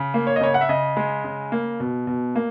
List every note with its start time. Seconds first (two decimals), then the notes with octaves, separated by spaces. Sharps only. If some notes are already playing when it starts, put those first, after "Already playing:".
Already playing: C#3
0.14 A#3
0.27 C#5
0.36 D#5
0.41 C#3 C#5
0.54 F#5
0.61 E5
0.69 C#3 D#5
0.97 G#3
1.24 C#3
1.52 A#3
1.80 B2
2.07 B2
2.35 A#3